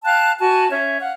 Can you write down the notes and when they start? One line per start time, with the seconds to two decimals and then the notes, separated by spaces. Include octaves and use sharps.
0.04 F5 G5 A5 F#6
0.39 F#4 G#5 A5
0.71 C#4 C#5 E5
1.00 F5 F#5